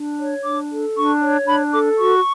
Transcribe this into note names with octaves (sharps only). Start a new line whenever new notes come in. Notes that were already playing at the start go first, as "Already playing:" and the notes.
Already playing: D4
C#5
D4 D6
A4
D4 C#6
C#5
D4 B5
A4 D6
F#4 C#6